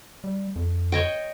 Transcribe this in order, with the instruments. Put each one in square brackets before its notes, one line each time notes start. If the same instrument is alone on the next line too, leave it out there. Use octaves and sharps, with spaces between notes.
[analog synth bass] G3
F2
[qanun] C#5 D#5 G5